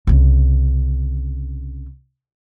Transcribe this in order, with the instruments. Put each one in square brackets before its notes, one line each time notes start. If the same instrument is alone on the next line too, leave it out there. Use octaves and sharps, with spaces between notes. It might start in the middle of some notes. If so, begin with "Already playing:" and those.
[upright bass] C2 C#3